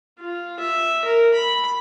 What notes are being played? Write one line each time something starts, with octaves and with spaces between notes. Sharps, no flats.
F4
E5
A#4
B5